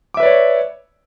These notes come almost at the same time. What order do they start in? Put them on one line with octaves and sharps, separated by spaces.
D6 E5 B4 D5 C#5